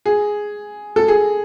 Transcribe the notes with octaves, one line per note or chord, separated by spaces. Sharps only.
G#4
A4
G#4